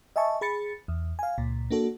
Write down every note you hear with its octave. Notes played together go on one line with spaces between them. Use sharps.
D#5 E5 G#5 A5 C#6
G#4 B5 A6 C#7
E2
F5 G#5
C#2 A#2
A#3 D4 F#4 A4